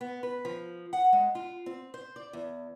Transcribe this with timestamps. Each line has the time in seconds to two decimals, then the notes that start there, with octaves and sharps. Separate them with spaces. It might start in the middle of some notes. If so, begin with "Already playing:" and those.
0.01 B3
0.23 B4
0.45 F3
0.93 F#5
1.13 G#3
1.35 F4
1.66 C4
1.94 C5
2.16 D5
2.33 E2